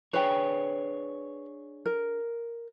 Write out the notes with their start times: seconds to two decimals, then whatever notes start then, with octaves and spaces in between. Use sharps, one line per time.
0.13 D4 G#4 B4 C#5 G5
1.86 A#4